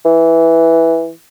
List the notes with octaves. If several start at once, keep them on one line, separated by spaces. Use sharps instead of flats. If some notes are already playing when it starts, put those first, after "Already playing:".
E3